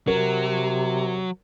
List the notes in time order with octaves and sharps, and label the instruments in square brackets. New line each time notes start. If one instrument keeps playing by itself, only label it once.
[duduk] C3 [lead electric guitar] F#3 [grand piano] A#4